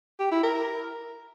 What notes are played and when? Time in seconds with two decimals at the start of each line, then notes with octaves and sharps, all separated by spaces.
0.20 G4
0.32 E4
0.43 A#4